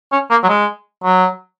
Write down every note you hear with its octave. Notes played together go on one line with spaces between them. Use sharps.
C#4
A#3
F#3
G#3
F#3